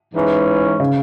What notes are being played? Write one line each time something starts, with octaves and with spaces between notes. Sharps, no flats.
G#2 E3 C#4
C#3